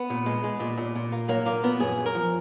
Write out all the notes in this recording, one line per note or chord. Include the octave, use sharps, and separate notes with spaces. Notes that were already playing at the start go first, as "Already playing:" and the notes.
Already playing: B3
A#2
G#3
G#3
A#2
A#2
A#2
A#3
F#3 A#3
A#2 A#3
A#2 B3
F#2 G#4
F#2
A#4
F3